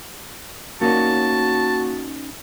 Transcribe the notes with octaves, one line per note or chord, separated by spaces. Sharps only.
A#3 C#4 D#4 F#4 C#5 A5